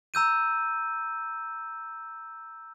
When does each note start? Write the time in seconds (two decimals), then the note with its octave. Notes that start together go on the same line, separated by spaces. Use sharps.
0.14 A#5 E6 G6 D#7